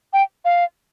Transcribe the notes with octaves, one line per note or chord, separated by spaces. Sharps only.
G5
F5